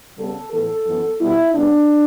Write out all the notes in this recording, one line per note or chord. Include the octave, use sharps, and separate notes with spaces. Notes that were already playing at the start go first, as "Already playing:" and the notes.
C#3 G3 B3 A4
A2 E3 B3 A4
F#2 E3 B3
B2 G3 B3 E4
C#3 G3 B3 D4